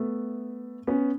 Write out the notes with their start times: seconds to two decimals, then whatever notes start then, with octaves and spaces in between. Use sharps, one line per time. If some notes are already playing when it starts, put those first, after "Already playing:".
Already playing: A3 B3
0.87 B3 C#4